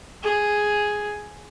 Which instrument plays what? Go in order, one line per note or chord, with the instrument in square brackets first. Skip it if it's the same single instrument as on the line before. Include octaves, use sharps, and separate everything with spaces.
[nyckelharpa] G#4